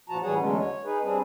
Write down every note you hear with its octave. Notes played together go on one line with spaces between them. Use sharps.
G2 A#2 F3 F#4 A5 A#5
A2 E3 G3 G#4 C#5 F#5
E2 D3 F#3 G#3 A3 C#4
C#5
D#4 G#4 B4
G3 C4 D4 G#4